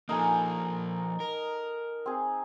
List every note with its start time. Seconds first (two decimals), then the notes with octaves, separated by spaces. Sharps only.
0.09 F3 A#3 D#4 A4 G#5
1.20 A#4
2.06 C4 G#4